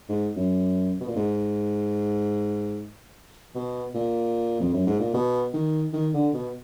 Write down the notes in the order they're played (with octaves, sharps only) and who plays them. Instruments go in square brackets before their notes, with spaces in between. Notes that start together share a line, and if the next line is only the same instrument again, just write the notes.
[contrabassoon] G#2
F#2
B2
A#2
G#2
B2
A#2
F2
F#2
G#2
A#2
B2
D#3
D#3
D3
B2